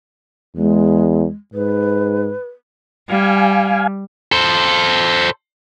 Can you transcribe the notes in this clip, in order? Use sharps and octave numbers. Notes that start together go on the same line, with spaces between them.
E2 G#3
G#2 B4
G3 F5 G#5
A4 C5